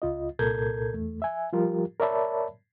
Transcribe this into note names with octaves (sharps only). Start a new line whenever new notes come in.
C#2 F4 D#5
C2 A#2 A4 A#4 G6 G#6
E2 A3
E5 G#5
F3 G3 F4 G4 A#4
A#4 C#5 D5 E5 A5 B5